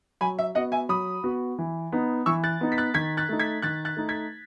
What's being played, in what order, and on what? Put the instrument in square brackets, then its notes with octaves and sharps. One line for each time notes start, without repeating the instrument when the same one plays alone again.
[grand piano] F#3 [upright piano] G#5 B5
[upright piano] E5
[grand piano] B3 F#4 [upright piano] D#5 F#5
[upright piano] E5 G#5
[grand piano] F#3 [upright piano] B5 D#6
[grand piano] B3 F#4
E3
B3 D#4
[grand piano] E3 [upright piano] C#6 E6
[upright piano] F#6 A6
[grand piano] B3 D#4
[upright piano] B6
F#6 A6
[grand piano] D#3 [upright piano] G#6 B6
[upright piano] F#6 A6
[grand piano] A3 D#4
[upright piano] G#6 B6
[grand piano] D#3 [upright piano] F#6 A6
[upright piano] F#6 A6
[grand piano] A3 D#4
[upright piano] G#6 B6